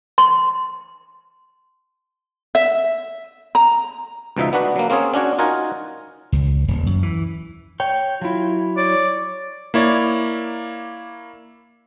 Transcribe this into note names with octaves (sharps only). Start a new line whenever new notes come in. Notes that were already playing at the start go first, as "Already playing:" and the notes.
C6
E5
A#5
C#2 B2 F3 D#4 E5
B3 D4 F#4 B4
F#3 A#3
A#3 C4 C#4 G#4 C#5
C#4 D4 F#4 C#5
D#4 F4 F#4 A#4 F#5 G#5
C#2
D#1
F#2
E3
C#5 G5
F#3 E4 F4
C#5 D5
A#3 E4 C#5 D5